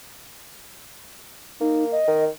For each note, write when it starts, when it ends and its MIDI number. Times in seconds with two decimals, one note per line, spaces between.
1.60 1.98 58
1.60 1.84 63
1.92 2.23 75
2.08 2.28 51